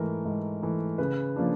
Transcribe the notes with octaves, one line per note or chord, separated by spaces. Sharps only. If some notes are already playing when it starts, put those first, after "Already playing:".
Already playing: G#2 E3 A3 A#4
G#2
E3 A3
C#3 B4
F3 A#3 D4